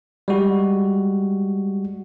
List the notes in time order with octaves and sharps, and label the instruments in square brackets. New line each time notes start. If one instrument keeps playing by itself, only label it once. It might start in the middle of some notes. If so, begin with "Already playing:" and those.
[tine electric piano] G3 G#3 F#4